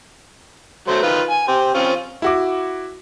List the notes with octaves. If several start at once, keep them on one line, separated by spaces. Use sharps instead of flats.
F#3 A3 C5
D#3 F4 B4
G#5
G4 C5
C4 C#4 F4
E4 F#4 D6